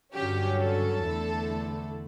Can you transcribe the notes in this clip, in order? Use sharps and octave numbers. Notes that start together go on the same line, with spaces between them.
G2 D3 F#3 C#4 G4
A4
E2 D3 A3 E4